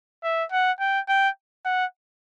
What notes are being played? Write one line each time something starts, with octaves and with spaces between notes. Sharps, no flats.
E5
F#5
G5
G5
F#5